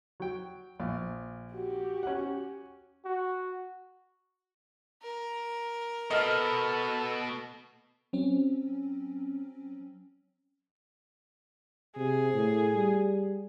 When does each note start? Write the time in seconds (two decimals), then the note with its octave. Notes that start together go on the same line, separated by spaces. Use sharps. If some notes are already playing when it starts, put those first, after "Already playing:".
0.20 F#3 G5
0.80 A#1 F5
1.53 F#4 G4
2.03 C#4 F#5
3.05 F#4
5.02 A#4
6.11 B2 A4 D#5 F6
8.13 F#3 C4 C#4
11.97 C3 G#4
12.34 A2
12.74 G3